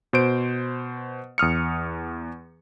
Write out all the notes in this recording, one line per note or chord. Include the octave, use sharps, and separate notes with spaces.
B2 C5 D7
E2 D#6 F6 C#7